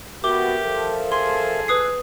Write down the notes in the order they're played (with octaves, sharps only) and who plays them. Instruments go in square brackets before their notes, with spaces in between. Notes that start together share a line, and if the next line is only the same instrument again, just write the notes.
[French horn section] B3 F#4 [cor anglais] G4 [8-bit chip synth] A#4 E5 [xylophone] D6 G7
[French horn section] F3 A4
[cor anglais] G#4 [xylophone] C6
[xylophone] B4 D#6 C7 [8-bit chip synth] E6 F#6